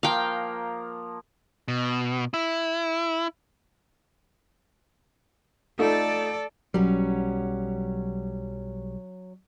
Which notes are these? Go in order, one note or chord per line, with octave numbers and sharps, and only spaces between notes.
F3 A#3 F5 G5 A#5
B2
E4
A3 D#4 F4 A4 D5
B1 F#3 G3 C#4